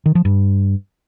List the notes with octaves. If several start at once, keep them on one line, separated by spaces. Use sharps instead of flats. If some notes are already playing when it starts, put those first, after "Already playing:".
D#3
F3
G2